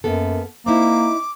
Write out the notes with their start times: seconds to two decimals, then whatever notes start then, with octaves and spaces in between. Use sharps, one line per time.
0.04 F#2 A#3 B3 A4
0.66 A#3 C4 D#4 E4 D6